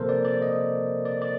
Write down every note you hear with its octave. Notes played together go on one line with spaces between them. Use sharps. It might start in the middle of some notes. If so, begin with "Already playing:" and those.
Already playing: C3 F3 A#3 A4 A#4 C5
D5
D5
D#5
D5
D5